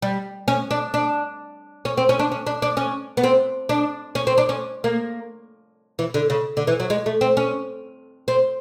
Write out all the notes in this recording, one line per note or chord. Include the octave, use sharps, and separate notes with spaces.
G3
C#4
D4
D4
C#4
C4
C#4
D4
C#4
D4
D4
C#4
B3
C4
D4
C#4
C4
D4
C#4
A#3
E3
D3
C#3
D3
E3
F#3
G#3
A3
C4
C#4
C4